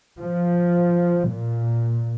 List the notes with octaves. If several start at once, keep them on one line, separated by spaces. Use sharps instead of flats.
F3
A#2